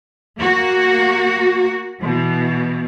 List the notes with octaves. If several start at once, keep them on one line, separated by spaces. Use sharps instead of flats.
A#3 F#4
B2 E3